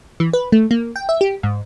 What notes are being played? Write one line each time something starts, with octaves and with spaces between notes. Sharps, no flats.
E3
B4
A3
A#3
G5
E5
G4
G#2